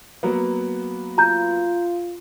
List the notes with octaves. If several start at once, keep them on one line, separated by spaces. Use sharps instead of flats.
F#3 A#3 B3
F4 A#5 G6